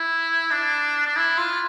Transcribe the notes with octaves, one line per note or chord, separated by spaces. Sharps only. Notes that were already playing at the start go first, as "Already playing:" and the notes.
Already playing: E4
D4
D4
E4
F4